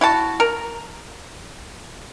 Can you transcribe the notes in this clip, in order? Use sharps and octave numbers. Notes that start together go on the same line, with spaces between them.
E4 F#4 A5
A#4